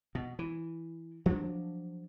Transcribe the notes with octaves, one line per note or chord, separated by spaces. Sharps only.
B2
E3
F3 F#3 B3 D4